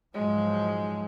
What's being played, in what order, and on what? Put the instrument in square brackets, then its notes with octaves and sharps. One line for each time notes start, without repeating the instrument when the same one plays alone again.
[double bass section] G#2 F3 F#3 [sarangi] G#3